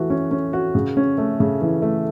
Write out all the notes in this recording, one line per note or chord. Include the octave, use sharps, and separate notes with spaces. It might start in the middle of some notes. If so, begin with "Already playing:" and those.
Already playing: E3 A3 F#4
C#4
C#4
F#4
C#3
C#4
A3
C#3
E3
A3